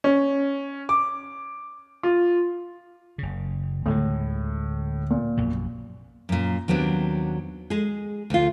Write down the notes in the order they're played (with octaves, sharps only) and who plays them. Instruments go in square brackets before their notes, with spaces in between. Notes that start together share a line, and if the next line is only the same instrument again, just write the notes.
[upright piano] C#4
D6
F4
[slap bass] F#1 C#3
[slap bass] D2 D3 G#3 [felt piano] A2
[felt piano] A#2
[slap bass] A#1 F#2 B2
[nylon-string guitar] F#2 A#2
D#2 F#3 B3 C4 D4
G#3 G#4
D2 F4